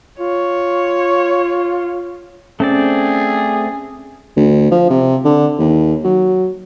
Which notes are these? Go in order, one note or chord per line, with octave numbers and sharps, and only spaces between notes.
F4 C#5
A3 C4 C#4 G#4 D5
D2
F3
C3
D3
D#2
F#3